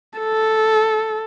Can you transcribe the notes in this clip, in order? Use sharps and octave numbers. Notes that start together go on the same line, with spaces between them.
A4